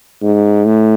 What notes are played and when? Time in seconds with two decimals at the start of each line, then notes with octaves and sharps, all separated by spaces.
0.22 G#2
0.66 A2